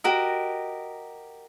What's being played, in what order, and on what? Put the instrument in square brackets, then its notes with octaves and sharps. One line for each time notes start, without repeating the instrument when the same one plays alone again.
[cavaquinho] F#4 G4 A#4 D#5